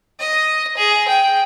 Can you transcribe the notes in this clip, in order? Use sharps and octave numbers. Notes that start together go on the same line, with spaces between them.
D#5
G#4
G5